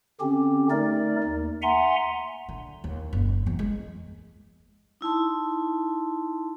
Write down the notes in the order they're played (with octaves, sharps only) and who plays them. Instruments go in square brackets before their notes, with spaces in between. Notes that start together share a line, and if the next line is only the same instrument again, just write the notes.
[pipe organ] D3 C4 C#4 G4
A3 D#4 A#4 D5
D#2
E5 F#5 G#5 A#5 C6
[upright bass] D3
D#2
F#1
E2
G#3
[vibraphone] D#4 E4 A5 C6